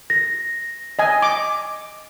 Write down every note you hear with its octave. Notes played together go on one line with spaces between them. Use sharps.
A#6
D#5 G#5
D6